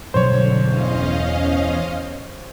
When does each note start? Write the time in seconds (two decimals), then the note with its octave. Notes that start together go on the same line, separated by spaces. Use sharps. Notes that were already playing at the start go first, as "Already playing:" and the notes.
0.14 G1 B2 D3 F#3 C5 C#5
0.67 E2 C#4 D#5 F5